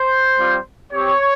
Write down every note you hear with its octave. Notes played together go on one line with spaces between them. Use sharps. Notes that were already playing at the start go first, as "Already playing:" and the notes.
Already playing: C5
G3 C4 F4
C4 G4 C#5